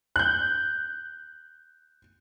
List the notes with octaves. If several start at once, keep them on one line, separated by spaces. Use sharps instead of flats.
F#6 G6